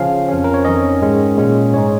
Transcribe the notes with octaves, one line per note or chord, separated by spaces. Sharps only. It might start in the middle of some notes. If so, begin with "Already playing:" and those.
Already playing: C#3 F3 C#4 F5
F2 F3 C#4
A#4
C#5
F2 D#3 C#4 D#5
G#2 D#3 G#3 C#4
A#2 G#3 C#4
G#2 G#3 D#4 C#5